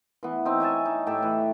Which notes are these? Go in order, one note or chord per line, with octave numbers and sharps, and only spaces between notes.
E3 B3
C4 D#4
C#5 E5 G#5 A5
D#4
A2 G4 E5 A5
E3 B4